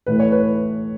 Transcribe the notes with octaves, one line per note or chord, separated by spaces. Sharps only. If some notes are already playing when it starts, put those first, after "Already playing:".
A2 E3 A3 B4
C#5
B4